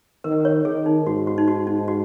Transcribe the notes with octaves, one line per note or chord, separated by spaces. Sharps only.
D#3 A#4
C#5
D#3 G#4
D#4
G#2 F#4
F#4
D#4
F#4
D#4
F#4